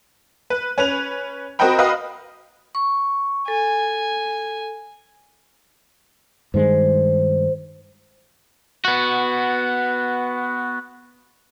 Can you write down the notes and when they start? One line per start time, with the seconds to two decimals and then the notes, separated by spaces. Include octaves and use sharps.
0.50 B4
0.78 C#4 B4 F7
1.59 C4 F#4 A#4 D#5 G5 B5
1.78 F#4 B4 D#5 F5 B5
2.75 C#6
3.48 A4 G#5
6.54 G2 D#3 G#3 C5
8.85 B3 F#4